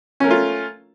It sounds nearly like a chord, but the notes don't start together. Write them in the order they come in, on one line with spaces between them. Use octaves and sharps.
C#4 A#4 A3 F4